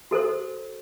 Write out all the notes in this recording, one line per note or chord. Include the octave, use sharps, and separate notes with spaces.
F#4 A4 A#4 C5